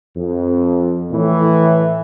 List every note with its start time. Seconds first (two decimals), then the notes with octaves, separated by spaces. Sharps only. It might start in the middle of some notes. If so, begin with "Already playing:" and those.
0.17 F2
1.12 A2 E3